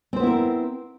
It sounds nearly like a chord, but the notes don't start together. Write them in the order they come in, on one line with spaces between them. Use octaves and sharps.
C4 C5 B3 E4 A#4